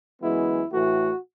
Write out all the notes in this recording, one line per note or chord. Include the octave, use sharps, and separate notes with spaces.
F#2 E3 G#3 B3 E4
A2 E3 A3 F#4